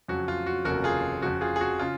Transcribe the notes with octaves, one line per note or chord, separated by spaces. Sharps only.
F2 C#3 F#3 F#4
F4
F#4
F1 D#2 C#3 F3 F#4 A#4
F4 G#4
F2 C#3 F3 F#4
F4 G#4
G#4
F#4
C#3 F4